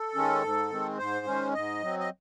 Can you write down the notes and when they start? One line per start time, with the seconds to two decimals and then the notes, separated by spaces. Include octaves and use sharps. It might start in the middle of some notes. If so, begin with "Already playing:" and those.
Already playing: A4
0.15 D#3 G#3 C#4
0.43 G#2
0.70 D#3 G#3 C4
0.98 G#2 C5
1.26 D#3 G#3 C#4
1.53 G#2 D#5
1.82 F#3 C4
1.99 D#5